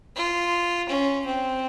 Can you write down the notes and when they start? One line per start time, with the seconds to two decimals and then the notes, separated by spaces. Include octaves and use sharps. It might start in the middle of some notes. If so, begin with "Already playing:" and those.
0.16 F4
0.89 C#4
1.26 C4